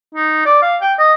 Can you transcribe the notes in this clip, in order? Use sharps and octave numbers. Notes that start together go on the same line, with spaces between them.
D#4
D5
F5
G5
D#5